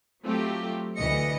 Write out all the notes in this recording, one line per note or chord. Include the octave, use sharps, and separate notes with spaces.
F#3 A3 C4 F4 G4
D2 E3 D#5 A#6 C#7